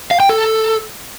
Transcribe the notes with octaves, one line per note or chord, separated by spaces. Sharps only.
F5
G5
A4